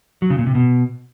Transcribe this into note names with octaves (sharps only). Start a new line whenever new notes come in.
F#3
C#3
A#2
C3
B2